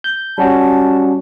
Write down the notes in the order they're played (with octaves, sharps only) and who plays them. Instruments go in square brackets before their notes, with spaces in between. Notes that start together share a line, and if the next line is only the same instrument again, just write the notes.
[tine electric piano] G6
[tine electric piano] G3 C#4 F#4 [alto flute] A5